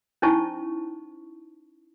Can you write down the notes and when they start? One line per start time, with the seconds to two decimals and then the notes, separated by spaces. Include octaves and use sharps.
0.22 C#4 D#4 E4 C5 A5 C#6